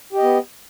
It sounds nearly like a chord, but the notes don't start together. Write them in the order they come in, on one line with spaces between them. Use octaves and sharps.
G4 D#5 B3